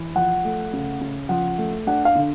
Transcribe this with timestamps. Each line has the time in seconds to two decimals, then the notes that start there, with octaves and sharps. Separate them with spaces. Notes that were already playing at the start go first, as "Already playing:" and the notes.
Already playing: E3
0.15 F3 F#5
0.44 A3
0.73 C#3
1.01 C#3
1.29 F3 F#5
1.58 A3
1.87 D4 F#5
2.05 F5
2.15 D3